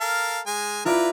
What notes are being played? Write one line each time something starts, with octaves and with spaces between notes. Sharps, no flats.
A4 A#4 F5
G#3 G#5
E4 F4 B4 D5 A#5